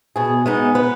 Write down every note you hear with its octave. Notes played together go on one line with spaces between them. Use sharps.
B2 G#4
G#3 B3 D#4
B3 B4